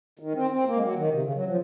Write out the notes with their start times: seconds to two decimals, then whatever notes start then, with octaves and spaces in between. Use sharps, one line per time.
0.19 D#3
0.35 C4
0.51 C4
0.65 A#3
0.76 G#3
0.81 F#3
0.96 D#3
1.11 C3
1.22 C#3
1.34 F#3
1.46 F3